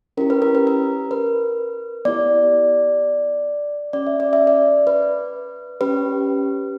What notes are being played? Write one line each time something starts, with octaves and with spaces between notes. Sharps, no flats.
C#4 E4 G4 A#4
B4
A#4
B4
A#4
B4
B3 E4 G4 D5
C#4 G4 D5
E5
D5
E5
D5
B4
C#4 G4 B4